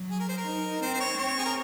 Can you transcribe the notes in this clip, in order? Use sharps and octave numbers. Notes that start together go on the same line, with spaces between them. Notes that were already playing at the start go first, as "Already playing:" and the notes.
Already playing: F#3
G#4
A#4
C5
A#4
D#4
C4 C5
C5
C#5
C4 C#5
G#4
A#4